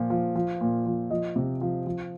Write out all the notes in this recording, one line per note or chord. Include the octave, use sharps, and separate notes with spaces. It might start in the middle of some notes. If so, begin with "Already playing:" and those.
Already playing: A#2 F3
F3
F3
A#2
F3
F3 D#5
C3
F3
F3